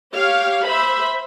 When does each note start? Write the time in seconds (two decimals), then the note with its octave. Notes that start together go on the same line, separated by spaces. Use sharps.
0.13 G4 C#5 F5
0.66 C5 E5 B5